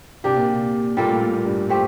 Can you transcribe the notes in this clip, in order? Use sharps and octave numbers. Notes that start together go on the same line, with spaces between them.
C3 A#3 D4 G4
A#2
C3
A#2 G3 A#3 F4 A4
A2
A2
A#2
G2
A3 C4 G4 C5